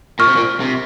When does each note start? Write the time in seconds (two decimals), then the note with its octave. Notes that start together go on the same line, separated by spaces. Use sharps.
0.19 A#2 C#6 F6
0.27 C3
0.36 A#2
0.60 C3